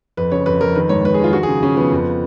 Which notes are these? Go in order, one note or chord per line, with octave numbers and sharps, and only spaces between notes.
F2 B4
C#3 C#5
F2 B4
F2 A#4
D#3 B4
G#2 C#5
G#2 B4
G#4
D#3 F4
F3 F#4
G#4
C#3
C#3 C#4
F3 B3
F2